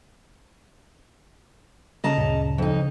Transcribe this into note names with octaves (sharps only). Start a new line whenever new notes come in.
C#3 D#5 A5 A#5
D2 G2 A#2
F2 D#4